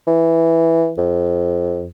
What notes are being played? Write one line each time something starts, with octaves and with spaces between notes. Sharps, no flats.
E3
F2